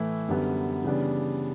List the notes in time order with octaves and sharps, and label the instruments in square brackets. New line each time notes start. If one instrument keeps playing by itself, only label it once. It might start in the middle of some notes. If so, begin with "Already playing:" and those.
Already playing: [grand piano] A2 E3 A3 E4
F#2 D3 G3 B3
C#3 E3 G3 B3 D4